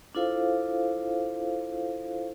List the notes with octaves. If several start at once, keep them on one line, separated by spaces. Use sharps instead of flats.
D4 E4 F4 A4 C5 F5